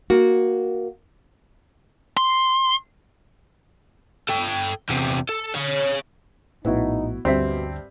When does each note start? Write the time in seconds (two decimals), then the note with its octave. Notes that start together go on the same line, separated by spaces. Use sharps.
0.10 A#3 F#4
2.17 C6
4.29 A4 G5
4.89 E2 C3
5.29 A4
5.54 C#5 F5
6.65 A#1 A2 B3 D#4 E4 F#4
7.25 D2 G2 B2 C4 E5 B6